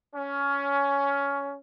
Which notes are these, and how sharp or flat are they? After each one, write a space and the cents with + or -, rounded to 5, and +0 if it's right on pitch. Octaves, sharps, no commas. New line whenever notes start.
C#4 +15